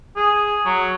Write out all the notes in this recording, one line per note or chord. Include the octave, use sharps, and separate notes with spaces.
G#4
F#3